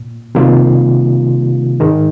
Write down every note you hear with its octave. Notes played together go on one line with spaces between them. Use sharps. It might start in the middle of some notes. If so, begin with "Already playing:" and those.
Already playing: A#2
C3 D#3 G3 A#3 F4
G#2 D#3 G#3